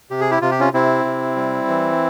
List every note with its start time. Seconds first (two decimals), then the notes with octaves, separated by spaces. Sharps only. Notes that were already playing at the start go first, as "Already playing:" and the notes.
0.10 C3 G4
0.21 G#4
0.31 E4 G4
0.41 C3 F4
0.51 G4
0.60 C#4 F4
0.73 C3 C4 E4
1.05 C3
1.36 G3
1.68 E3